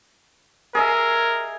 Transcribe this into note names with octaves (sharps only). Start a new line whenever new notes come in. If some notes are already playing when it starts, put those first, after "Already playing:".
G#4 A#4 D#5 E5